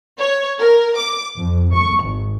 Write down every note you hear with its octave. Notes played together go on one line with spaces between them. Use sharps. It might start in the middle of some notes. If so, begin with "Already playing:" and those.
C#5
A#4
D6
F2
C#6
G#1